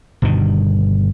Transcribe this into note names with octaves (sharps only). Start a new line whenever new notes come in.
G1 G2 B2 D#3